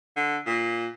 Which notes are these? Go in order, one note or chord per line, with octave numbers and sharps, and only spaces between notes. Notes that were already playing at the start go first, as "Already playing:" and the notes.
D3
A#2